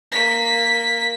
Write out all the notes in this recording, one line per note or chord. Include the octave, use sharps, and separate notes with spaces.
A#3 B6